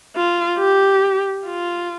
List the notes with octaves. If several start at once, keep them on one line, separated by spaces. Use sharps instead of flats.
F4
G4
F4